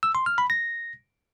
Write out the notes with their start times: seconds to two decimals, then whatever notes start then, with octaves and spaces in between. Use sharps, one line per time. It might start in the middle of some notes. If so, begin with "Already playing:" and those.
0.03 E6
0.15 C6
0.26 F6
0.38 B5
0.50 A#6